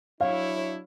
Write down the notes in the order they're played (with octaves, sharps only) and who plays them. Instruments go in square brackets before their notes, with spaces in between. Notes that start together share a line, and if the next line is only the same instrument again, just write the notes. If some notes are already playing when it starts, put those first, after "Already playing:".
[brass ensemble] F#3 D4 E4 [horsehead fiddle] C#5 [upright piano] F5